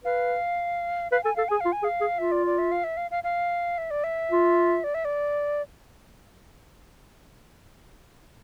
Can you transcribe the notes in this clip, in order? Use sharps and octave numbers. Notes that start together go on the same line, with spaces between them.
B4 F5
B4 F5
A4 G#5
A4 F5
G#4 G#5
F4 F5
G#5
G#4 F5
G#4
F4 E5
D5
D5
E5
F5
E5
F5
F5
F5
E5
D5
E5
F4
D5
E5
D5